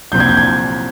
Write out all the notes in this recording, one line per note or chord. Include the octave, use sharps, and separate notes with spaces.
C2 A#2 F3 C4 G6
G#6
G6
G#6